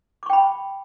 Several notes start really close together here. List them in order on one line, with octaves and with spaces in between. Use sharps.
D6 C#6 G5 B5